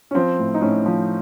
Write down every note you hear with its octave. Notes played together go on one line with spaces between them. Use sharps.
C#4
F3 C4
A2
D#4
A2 C#4
F3